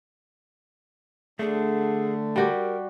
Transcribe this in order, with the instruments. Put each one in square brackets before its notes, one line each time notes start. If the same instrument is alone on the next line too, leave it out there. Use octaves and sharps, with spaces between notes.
[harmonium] D3 [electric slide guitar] A3 D4 [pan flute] G#4
[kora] G3 F#4 G4 [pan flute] A#4